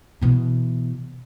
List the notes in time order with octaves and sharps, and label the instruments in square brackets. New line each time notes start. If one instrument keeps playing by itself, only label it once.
[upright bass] B2 E3